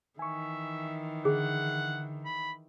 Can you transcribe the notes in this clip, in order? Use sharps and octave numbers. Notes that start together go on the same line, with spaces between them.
D#3 E3 E5 G#5 C#6
D3 G#4 F#5
B5